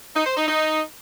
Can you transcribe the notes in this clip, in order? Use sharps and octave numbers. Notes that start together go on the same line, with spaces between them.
D#4
C5
D#4
D#4